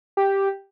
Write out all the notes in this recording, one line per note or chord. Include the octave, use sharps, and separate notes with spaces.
G4